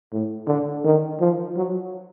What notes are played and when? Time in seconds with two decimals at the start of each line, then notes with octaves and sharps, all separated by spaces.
0.12 A2
0.48 D3
0.84 D#3
1.20 F3
1.57 F#3